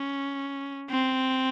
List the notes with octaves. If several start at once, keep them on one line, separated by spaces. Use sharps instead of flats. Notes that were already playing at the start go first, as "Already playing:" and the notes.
Already playing: C#4
C4